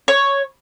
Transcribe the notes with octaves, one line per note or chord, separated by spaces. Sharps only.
C#5